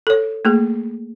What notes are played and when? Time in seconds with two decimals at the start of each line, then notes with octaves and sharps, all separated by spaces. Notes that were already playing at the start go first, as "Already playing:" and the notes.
0.07 A4 C#5
0.45 A3 A#3 G#4